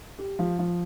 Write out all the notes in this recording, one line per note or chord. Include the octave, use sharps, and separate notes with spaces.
G4
F3
F3